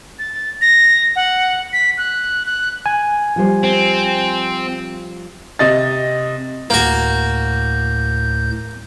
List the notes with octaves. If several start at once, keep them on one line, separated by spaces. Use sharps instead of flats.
A6
A#6
F#5
B6
F#6
F#6
G#5
F3 G3 C5
C4
C3 D#5 A6
D2 A2 A#3 F#4 G6